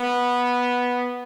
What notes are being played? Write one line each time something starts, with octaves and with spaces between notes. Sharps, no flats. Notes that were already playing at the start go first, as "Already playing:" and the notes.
Already playing: B3